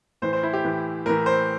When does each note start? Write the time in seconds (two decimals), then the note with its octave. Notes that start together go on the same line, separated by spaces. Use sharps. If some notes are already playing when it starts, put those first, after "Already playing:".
0.22 A2 E3 C5
0.33 C5
0.43 E4
0.53 G4
0.64 A2 E3
1.06 A2 E3 A#4
1.26 C5